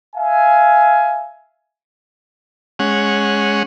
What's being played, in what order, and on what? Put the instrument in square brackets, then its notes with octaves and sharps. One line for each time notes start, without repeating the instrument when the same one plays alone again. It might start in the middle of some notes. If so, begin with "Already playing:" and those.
[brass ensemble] E5 F5 G#5
[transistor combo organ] G#3 C#4 F#5